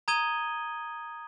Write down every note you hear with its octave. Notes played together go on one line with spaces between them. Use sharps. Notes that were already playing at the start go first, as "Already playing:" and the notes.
A#5 D#6 G#6 D#7 G7